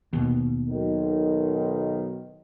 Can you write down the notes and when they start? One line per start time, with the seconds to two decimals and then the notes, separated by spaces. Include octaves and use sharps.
0.13 D#2 B2
0.70 B1 D#3